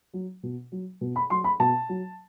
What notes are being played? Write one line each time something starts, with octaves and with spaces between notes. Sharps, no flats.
F#3
B2
F#3
B2
B5
F#3 C6
B5
B2 A5
F#3